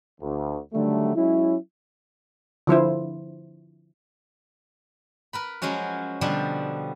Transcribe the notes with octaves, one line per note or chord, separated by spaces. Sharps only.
D2
D3 D#3 F#3 G3 A3
F#3 G#3 C#4 E4
D3 F3 E4 C5
A#4 B4 B5
F3 F#3 G#3 C#4 F#4
B2 D3 F3 G3 D4